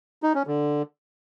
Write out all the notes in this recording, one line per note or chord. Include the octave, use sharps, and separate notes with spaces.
D#4
C#4
D3